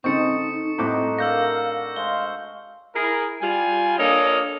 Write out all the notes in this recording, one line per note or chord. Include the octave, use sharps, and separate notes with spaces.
C#3 C4 D#4 A4 D#5 C#6 C#7
A2 C4 D#4 F#4 D6
A3 D4 A#4 F5 E6 G6 A#6
G#3 C5 F5 G7
E4 G#4 A#4
G3 F4 G#5
A#3 D4 A4 C#5 D#5 F5